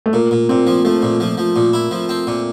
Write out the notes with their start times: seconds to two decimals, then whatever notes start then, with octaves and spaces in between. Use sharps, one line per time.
0.06 A3
0.13 A#2 A#3
0.31 A#2
0.49 A#2 C4
0.67 F3
0.85 F3 A3
1.02 A#2
1.20 F3
1.38 F3
1.56 A#2
1.73 E4
1.91 F3
2.09 C4
2.27 A#2